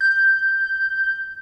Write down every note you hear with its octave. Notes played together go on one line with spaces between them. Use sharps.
G6